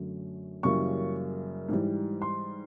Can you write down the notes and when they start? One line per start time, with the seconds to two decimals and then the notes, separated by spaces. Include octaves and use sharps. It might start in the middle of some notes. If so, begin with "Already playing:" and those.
Already playing: F#2 D3 F#3 A3
0.63 F#2 C#3 E3 G3 A#3 C#6
1.69 G#2 E3 G3
2.22 C6